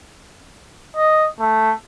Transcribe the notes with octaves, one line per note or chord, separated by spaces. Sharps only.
D#5
A3